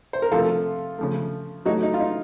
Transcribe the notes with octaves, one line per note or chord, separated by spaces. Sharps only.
C5
A#4
C3 F3 A3 F4 A4
C#3 F3 A3
A2 F#3 A3 D#4 F#4
D#4
F4
D#4